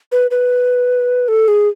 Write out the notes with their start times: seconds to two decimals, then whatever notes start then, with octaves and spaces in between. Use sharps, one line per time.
0.12 B4
0.31 B4
1.28 A4
1.48 G#4